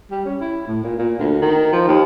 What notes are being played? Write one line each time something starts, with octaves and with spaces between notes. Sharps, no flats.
G3
C#4
E4
A2
A#2
A#2
D2
D#3
F3
D#2